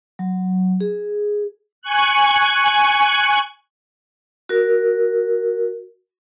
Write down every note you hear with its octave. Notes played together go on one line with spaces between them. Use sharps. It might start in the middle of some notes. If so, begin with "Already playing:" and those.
F#3
G#4
G#5 C#6 F#6
F#4 A#4